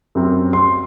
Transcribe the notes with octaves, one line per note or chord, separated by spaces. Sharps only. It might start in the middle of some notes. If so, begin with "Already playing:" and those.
F#2 C4
C6